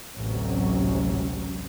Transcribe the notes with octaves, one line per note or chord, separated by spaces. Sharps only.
A1 D2 G#2 C3 F#3 C#4